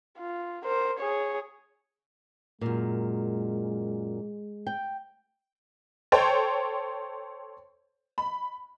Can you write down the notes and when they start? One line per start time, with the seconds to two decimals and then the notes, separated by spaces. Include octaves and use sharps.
0.19 F4
0.65 A#4 C5
1.00 G#4 C#5
2.61 F#2 A#2 G#3
4.67 G5
6.12 A4 C5 C#5 G5
8.18 B5